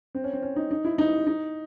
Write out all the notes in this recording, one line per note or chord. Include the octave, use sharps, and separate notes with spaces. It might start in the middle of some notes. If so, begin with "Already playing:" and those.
C4
C#4
C4
C#4
D#4
D#4
E4
D#4
D#4